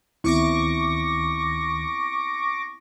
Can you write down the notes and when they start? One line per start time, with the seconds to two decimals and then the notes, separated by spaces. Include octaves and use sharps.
0.24 D2 D#3 B3 C4 E4 C#6 D6 A#6